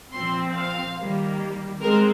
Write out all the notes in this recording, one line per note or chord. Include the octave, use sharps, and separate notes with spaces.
A#2 F3 C4 C6
F5
D#3 G3 A#3
G#3 C4 A#4